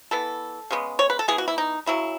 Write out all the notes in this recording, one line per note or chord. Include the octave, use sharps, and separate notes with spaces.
E3 B3 A4
C#3 G#3 B3
C#5
B4
A4
E3 B3 G#4
F#4
E4
D#4
C#3 F#3 C#4 E4